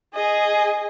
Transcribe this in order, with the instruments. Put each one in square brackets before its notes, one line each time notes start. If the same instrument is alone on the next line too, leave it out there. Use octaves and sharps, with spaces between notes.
[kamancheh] G#4 D#5